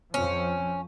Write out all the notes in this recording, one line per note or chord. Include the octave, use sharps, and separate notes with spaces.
F2 F3 C#4